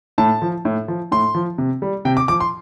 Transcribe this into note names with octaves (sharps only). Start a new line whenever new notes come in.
A2 A5
F3
A2
F3
A2 C6
F3
C3
G3
C3 G5
D6
F3 D6
C6